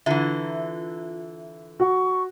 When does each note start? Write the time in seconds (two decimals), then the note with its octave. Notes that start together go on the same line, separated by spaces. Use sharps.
0.06 D3 E3 F4 E5
1.80 F#4 C#6